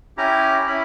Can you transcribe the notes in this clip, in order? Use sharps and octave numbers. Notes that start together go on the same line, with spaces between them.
C#4 E4 G4 A#5
C#4 E4 B5